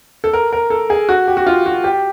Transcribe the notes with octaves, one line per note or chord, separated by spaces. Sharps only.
A4
A#4
A#4
A4
G#4
F#4
G4
F#4
F4
F#4
G4